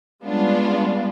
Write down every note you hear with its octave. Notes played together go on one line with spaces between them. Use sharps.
G3 G#3 B3 C#4 D4 F4